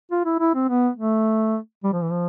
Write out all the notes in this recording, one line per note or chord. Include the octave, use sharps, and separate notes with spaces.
F4
E4
E4
C4
B3
A3
G3
F3
E3
F3